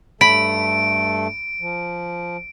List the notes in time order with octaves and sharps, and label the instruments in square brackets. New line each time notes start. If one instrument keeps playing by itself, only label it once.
[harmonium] G2 A3 A4 [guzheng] B5 [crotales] D7
[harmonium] F3